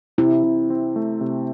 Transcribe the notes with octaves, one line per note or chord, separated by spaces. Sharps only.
C3 E4
C3
C4
A3
C3